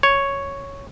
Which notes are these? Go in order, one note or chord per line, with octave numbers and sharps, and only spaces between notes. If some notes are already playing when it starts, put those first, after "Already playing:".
C#5